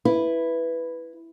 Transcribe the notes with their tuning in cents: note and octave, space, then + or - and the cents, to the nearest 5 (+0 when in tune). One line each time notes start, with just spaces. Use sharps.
E4 +0 B4 +0